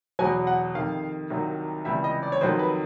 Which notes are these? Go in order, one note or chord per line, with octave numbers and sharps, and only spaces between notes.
E2 B2 F#3 G#5
F#5
F2 C3 D#3 F5
C2 C3 D#3 F#3
C#2 C3 E3 G3 E5
D#5
D5
C#5
F2 C3 D#3 F#3 C5
B4